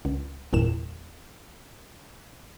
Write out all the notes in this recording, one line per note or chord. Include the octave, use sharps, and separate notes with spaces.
C#2
G1 E2 A#2 E7